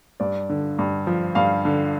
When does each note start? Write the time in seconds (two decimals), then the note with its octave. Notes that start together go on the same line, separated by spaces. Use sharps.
0.20 G2 D5
0.50 D3
0.79 G2
1.07 F3
1.35 G2 F5
1.65 D3